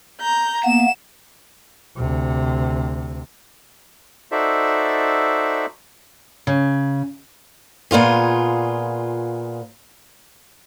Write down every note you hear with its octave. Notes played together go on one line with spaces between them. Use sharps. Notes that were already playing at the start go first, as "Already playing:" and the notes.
A#5 G6
A#3 B3 E7
D2 C3
D#4 F#4 A4 C5 D5 E5
C#3
A#2 B3 F4 G#4